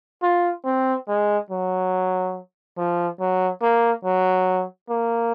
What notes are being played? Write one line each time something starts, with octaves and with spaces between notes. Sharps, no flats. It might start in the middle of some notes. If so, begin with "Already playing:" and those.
F4
C4
G#3
F#3
F3
F#3
A#3
F#3
A#3